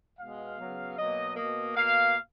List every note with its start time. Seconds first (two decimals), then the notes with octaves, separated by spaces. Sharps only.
0.19 B2 G#3 B3 F5
0.59 C#3 F#3 B3
0.98 B2 F#3 A#3 D#5
1.36 B2 A#3 D#5
1.76 B2 A#3 F5